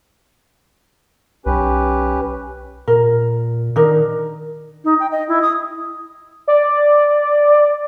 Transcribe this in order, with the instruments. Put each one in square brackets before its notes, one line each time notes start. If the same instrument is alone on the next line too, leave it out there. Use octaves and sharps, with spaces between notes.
[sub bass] B1 [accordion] C#4 G4 B4
[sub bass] A#2 [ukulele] A#4
[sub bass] D#3 [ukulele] D4 D#4 A#4
[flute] D#4
G5
D#5
E4
D#6
[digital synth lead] D5